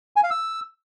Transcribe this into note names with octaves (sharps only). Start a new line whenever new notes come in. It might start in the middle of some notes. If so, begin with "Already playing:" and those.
G#5
F5
E6